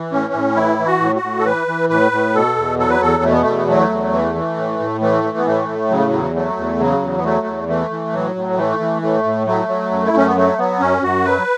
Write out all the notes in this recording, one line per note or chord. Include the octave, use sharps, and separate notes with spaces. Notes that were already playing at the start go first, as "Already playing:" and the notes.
Already playing: E3
A2 C#4
A2
E3 E4
E3
F#4
A2
F#4
A2
A4
E3 B4
E3
A2 B4
A2
B2 A4
E2
F#3 A4
B4
E2 A4
B2 A3
B3
E2 A3
B3
F#3 A3
E2
E3
E3
A2
A2
E3 A3
E3
B3
A2 A3
A2
C#3 F#3
A3
F#3
E2
F#3 A3
E2
C#3 F#3
E2
B3
F#3 A3
E2
E3 A3
E3
A2 F#3
A2
E3 A3
E3
A2 A3
A2
F#3 A3
F#3
F#2
E4
F#2 C#4
B3
F#3 A3
F#3 B3
F#2 C#4
F#2 F#4
F#3 B4